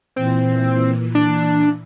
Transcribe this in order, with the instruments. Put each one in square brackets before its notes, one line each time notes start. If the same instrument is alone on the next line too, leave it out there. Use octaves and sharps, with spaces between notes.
[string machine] A#2 E3 [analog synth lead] C4
[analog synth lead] D4